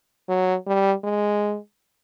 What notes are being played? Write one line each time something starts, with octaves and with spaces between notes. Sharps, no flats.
F#3
G3
G#3